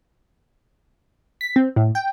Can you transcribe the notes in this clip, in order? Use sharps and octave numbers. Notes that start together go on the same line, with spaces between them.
B6
C4
A2
G5